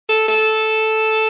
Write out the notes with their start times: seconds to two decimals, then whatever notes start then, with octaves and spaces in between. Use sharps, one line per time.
0.09 A4
0.27 A4